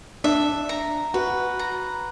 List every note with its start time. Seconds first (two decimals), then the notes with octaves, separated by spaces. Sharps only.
0.24 D4 E5
0.69 A#5
1.14 F#4 B4
1.59 A#5